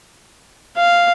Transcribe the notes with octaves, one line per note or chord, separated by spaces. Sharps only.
F5